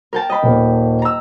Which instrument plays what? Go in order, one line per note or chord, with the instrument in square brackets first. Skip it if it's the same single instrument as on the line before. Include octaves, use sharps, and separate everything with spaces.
[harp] A#4 G5 A5
D#5 B5
[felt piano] D#1 A#3
[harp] A#5 E6